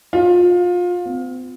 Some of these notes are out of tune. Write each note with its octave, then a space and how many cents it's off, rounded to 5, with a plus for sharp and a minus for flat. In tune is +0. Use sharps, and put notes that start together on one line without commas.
F4 +25
C4 -40